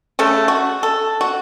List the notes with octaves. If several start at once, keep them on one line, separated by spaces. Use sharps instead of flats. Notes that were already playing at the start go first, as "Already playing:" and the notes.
C#3 A3 A4
F#4
A4
F#4